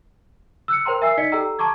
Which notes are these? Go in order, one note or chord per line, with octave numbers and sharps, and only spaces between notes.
E6 F#6 C#7
A#4 C5 G5 A#5 C6
A#4 E5 G#5 E6 C7
D#4 D5 D#5 B6 C#7
G4 A4 G5 A#5 E6
A5 A#5 C#6 D6 G#6